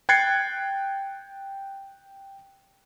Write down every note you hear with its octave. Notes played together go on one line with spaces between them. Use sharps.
G5 F#6 G#6 A6 C7 C#7